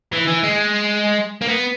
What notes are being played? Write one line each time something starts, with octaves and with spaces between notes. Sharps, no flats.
E3
E3
G#3
A#3
B3